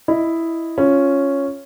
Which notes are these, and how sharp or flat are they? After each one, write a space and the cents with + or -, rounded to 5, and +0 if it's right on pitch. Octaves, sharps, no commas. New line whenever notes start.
E4 +0 D#5 +0
C#4 +0 F4 +0